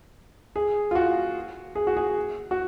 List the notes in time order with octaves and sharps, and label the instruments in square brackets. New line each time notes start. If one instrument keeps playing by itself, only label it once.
[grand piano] G#4
F4
F#4
G#4
F#4
G#4
F#4